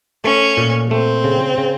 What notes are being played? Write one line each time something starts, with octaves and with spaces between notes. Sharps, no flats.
A3 C#4
A#2
A3 C4
C#3
C#3